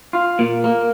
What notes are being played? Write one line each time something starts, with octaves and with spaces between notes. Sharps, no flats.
F4
A#2
A#3